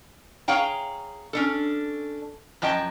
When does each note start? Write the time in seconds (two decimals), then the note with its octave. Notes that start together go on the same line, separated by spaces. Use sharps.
0.48 G#4 C#5 F5 G5 A#5
1.33 C#4 D4 A4
2.62 F#2 F3 D#5 G5 A5